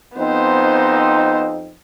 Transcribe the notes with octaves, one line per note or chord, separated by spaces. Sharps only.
F2 B3 C4 D#4 C5